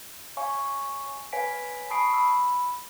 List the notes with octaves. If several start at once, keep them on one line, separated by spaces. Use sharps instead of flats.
C#5 F5 G#5 C#6
B4 C#5 F5 G#5 B6 D7
A5 B5 C#6 D#6 C7 D7
B5 E6